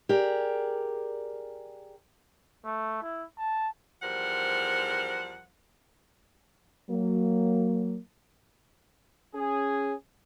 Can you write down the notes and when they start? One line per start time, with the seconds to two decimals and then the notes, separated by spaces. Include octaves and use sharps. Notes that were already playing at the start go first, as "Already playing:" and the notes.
0.09 G4 G#4 A#4 D5
2.65 A3
3.03 E4
3.38 A5
4.02 E2 F3 G3 A#4 C5 F#5
6.90 F#3 A#3
9.35 C#4 G#4